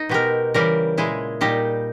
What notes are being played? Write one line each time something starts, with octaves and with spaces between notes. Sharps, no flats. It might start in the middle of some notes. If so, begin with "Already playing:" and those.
Already playing: D#4
B2 G#3 G4 A#4
C#3 E3 G3 G4 A#4
A#2 G#3 E4 G#4
A#2 G3 D#4 G4